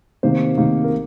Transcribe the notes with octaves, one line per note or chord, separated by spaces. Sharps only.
C3 D#3 A#3 C5
C3 D#3 A#3
A#4